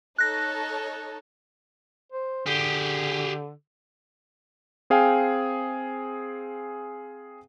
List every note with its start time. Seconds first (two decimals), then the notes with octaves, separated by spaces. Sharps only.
0.18 D#4 A4 C#5 F#6 A#6
2.12 C5
2.46 D3 G4 G#4
4.90 C4 G#4 F5 G5 G#5